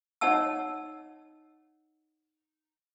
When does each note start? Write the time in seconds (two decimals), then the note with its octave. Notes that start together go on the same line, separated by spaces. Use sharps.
0.21 D#4 C#5 D#5 F#5 A5 E6